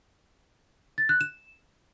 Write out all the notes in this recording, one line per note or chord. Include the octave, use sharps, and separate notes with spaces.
A6
F#6
E7